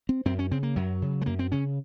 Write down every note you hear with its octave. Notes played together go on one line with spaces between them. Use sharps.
C4
F#2 C4
C#4
C#3 C4
A#3
F#2 F#3
C#3
G#3
F#2 A#3
C4
C#3 C#4